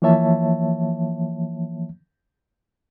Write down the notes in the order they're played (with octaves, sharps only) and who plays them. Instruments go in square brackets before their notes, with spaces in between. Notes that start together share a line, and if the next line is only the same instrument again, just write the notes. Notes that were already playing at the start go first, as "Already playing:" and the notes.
[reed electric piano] E3 F3 A#3 C#5 E5 A5